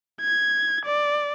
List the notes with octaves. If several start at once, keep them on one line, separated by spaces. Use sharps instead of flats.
G#6
D5